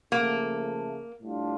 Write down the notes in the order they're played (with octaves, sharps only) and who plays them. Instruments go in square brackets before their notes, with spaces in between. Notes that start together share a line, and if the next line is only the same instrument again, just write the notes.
[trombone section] C#3 F3 A3 [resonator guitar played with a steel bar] A#3
[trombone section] A2 G3 D4 F4